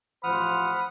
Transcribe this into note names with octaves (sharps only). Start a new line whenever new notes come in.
A1 F3 C5 F#5 B5 D#6 F6